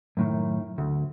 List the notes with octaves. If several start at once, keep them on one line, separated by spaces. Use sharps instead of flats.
F#2 A2 D#3
D2